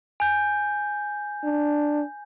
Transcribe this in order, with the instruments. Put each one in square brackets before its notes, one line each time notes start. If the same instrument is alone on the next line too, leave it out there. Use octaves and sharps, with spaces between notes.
[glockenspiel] G#5 G6
[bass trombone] D4